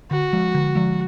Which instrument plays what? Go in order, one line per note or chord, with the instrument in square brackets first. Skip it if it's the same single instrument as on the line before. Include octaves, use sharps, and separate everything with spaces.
[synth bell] D3 [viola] F#4
[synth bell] F3 G#3
D3
F3 G#3